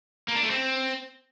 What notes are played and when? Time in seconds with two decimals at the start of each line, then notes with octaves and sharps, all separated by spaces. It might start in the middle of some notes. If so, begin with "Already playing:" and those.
0.28 A#3
0.36 D4
0.43 A3
0.50 C4